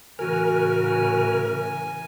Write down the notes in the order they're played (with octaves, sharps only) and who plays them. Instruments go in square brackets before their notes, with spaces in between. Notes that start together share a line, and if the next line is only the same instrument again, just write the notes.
[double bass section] A2 C#3 E3 [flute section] F#4 [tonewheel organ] A#4 [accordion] G#5